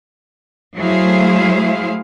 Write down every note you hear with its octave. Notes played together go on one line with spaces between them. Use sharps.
F#3 A3 E4 G#4 C5 F5